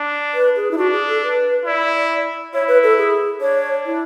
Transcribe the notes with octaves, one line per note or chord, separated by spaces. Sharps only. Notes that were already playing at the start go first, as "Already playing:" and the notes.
Already playing: D4
B4
G#4
E4
D4 F#4
G#4
A4
B4
E4 D5
E4 C#5
B4
A4
G#4
D4 C#5
E4